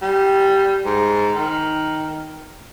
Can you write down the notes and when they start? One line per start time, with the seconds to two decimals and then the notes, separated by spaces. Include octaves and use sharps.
0.02 G3
0.85 G#2
1.36 D#3